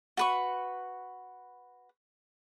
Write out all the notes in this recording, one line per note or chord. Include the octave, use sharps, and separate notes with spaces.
F#4 B4 C#6